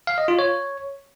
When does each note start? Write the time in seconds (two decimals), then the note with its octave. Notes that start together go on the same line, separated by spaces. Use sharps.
0.07 F5
0.18 D#5
0.28 F4
0.39 C#5